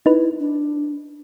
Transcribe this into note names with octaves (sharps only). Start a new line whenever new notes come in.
D#4 E4 B4
D4